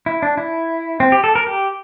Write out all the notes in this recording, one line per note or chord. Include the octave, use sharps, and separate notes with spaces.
E4
D4
E4
C4
G4
A4
A#4
G4